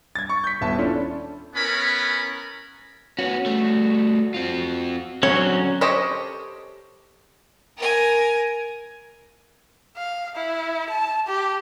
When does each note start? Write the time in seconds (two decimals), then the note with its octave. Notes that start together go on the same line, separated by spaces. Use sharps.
0.15 G#6 A6
0.29 C#6
0.44 G6 B6
0.61 D#1 B3 E5 A5
0.78 C#4 D4 E4 F4 A4 C#5
1.55 B3 C#4 E4 A#4 B5
3.19 B3 C#4 F#4
3.46 G3 A3
4.34 C4 F4
5.23 D3 F#3 C4 C#4 C#5
5.81 G4 A4 C5 C#5 D#5
7.78 A#4 G#5
9.96 F5
10.35 E4
10.90 A5
11.27 G4